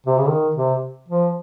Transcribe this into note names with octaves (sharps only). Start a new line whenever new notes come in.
C3
C#3
D#3
C3
F3